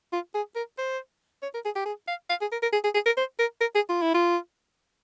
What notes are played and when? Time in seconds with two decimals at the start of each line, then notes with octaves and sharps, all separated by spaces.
0.13 F4
0.34 G#4
0.55 A#4
0.78 C5
1.42 C#5
1.54 A#4
1.65 G#4
1.76 G4
1.86 G#4
2.08 F5
2.30 F5
2.41 G#4
2.52 A#4
2.62 A#4
2.73 G#4
2.84 G#4
2.94 G#4
3.06 A#4
3.17 C5
3.39 A#4
3.61 A#4
3.75 G#4
3.89 F4
4.02 E4
4.14 F4